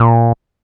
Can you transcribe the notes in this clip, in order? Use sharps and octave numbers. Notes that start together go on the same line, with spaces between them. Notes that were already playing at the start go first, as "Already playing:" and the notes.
Already playing: A#2